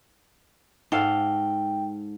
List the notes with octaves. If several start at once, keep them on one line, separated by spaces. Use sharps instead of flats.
G#2 A4 F5 G5